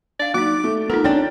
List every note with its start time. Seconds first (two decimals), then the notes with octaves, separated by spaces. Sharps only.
0.20 D4 D5 F5
0.34 F#3 A#3 D#4 D6
0.64 A3
0.90 B3 D#4 F4 A4 A#4
1.04 C#4 D4 G5 A6